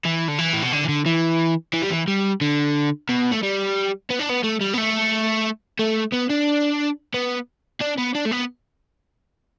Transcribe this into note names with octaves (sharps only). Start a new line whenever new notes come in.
E3
D3
E3
A2
B2
D3
E3
D3
E3
E3
G3
E3
G3
D3
B2
A3
G3
B3
D4
B3
A3
G3
B3
A3
A3
B3
D4
B3
D4
B3
D4
A3
B3